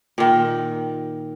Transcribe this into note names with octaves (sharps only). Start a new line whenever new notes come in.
A#2 D#3